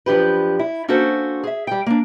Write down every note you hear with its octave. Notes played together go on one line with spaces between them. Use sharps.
F#2 F3 D4 G4 B4
E4
A#3 C#4 D4 F#4 A4 C5
G#4 E5
G3 G5
A#3 D4